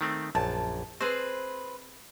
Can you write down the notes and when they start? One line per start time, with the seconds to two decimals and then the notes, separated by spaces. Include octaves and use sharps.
0.01 D#3 A3 C4
0.35 A#1 F#2 A5
1.01 C4 G#4 B4 C5